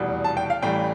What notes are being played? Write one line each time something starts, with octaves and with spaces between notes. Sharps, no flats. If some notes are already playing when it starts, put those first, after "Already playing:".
Already playing: F1 E2 B2 G3
A5
G5
F5
A1 A2 E3 G3 G5